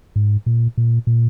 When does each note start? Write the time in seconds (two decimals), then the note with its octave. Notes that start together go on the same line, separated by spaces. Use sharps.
0.16 G#2
0.46 A#2
0.78 A#2
1.07 A#2